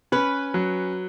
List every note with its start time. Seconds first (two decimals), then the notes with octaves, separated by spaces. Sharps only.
0.12 C#4 B4
0.54 F#3